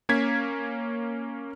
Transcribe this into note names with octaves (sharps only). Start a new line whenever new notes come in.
A#3 C#4 G#6 B6